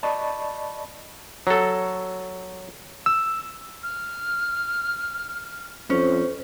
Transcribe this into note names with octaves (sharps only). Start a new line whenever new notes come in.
D5 D#5 A5 B5 C#6
F#3 A4
E6
F6
F2 C#4 C5